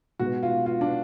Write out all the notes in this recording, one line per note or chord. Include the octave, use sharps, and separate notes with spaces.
B2 G#3 B3 F#4
F4
F4
D4